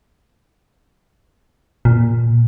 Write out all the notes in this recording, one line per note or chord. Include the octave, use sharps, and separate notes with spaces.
A#2